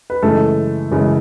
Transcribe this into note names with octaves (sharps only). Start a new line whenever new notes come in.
B4
F#2 C#3 E3 G#3 A3 A4
F#2 C#3 E3 G#3